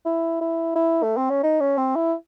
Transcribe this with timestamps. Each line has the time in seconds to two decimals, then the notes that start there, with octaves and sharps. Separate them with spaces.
0.06 E4
0.41 E4
0.76 E4
1.03 A3
1.17 C4
1.30 C#4
1.43 D#4
1.61 C#4
1.78 C4
1.96 E4